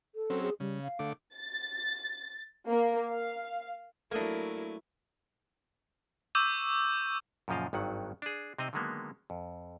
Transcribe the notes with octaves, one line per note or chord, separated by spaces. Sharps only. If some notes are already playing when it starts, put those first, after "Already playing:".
A4
F#3 C4 C#4
G#4
C#3 G3
F5
D3 A3 D6
A6
A#3
F5
F#3 A3 A#3 D4 E4 A#4 D#6
C#6 D6 E6 G6 D#7
F#2 A#2 C#3 F3 D#5 F5
G#1 G2 D#3 F#3 F#5
D4 G#4
C3 C4 D#4 D#5 A#5
D3 D#3 F#3 G#3 A#3 B3
F2